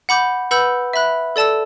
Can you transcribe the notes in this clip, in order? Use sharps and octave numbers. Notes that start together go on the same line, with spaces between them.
F#5 B5 D6 G6
B4 F#5 B5 E6 G6
E5 B5 F#6
A4 D5 A5 E6